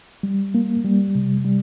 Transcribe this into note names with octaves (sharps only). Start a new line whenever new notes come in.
G3
A#3
G3
C3
G3